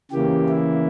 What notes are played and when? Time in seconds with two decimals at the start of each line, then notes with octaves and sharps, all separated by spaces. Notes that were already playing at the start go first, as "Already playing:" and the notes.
0.11 C#3 E3 A#3 G4
0.49 E4